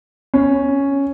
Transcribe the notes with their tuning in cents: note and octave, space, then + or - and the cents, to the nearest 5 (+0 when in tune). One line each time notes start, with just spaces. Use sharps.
C#4 +0